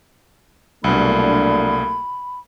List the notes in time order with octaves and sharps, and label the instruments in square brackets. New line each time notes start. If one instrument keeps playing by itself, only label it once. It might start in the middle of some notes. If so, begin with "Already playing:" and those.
[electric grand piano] C2 B2 [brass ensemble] F#3 A3 A#3 [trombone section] D4 [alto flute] B5